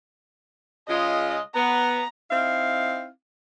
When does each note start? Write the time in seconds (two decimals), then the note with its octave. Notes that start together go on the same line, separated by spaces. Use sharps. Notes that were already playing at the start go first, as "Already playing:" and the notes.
0.89 C#3 G#3 F4 D#5
1.55 B3 A#5
2.31 C4 D#4 E4 F5